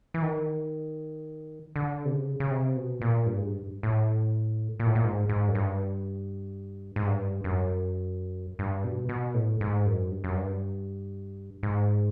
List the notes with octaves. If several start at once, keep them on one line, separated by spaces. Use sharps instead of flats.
E3
D#3
D3
C3
C#3
C#3
C3
B2
A#2
G2
G#2
G2
A2
A#2
A2
A#2
G#2
G#2
F#2
G2
G#2
G2
F#2
G2
B2
B2
A2
G#2
F#2
G2
F#2
G2
G#2